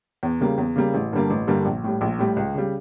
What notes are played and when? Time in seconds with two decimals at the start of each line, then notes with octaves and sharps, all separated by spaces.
0.23 E2
0.41 C#3 G3 A#3
0.58 E2
0.76 C#3 G3 A#3
0.94 A1
1.13 G2 D3 G3 A#3
1.30 A1
1.47 G2 D3 G3 A#3
1.65 A#1
1.84 A2 G3
2.01 A#1
2.19 A2 G3
2.37 C#2
2.55 C#3 G3